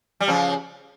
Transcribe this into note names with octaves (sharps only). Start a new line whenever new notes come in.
G3
C#3 F3